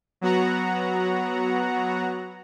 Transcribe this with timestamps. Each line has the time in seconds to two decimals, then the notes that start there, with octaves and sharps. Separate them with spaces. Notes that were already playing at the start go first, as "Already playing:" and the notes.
0.21 F#3 B3 F#4 F#5 A#5